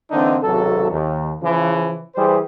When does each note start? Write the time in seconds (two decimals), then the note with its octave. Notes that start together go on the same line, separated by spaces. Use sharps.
0.11 D3 E3 A#3 C4 D4 D#4
0.43 G#1 C#2 C3 F#3 A4
0.91 D#2
1.42 C#3 E3 F3
2.15 E3 G3 G4 G#4 C5